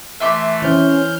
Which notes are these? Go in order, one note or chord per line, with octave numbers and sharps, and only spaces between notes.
E3 A3 E5 C6 D6
E3 C#4 C5 F6 G6